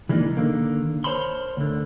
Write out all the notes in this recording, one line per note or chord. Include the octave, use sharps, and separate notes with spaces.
E3 G3 G#3 A#3 D4 D#4
D3 D#3 A#3
A#4 C5 C#5 A5 B5 C6
D2 D3